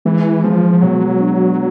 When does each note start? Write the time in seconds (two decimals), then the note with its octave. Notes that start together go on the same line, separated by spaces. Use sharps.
0.05 E3 G#3
0.43 F3 G#3
0.82 B2 F#3
1.20 D4